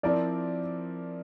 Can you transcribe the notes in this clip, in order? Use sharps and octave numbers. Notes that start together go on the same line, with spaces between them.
F3 C4 E4 A#4 D5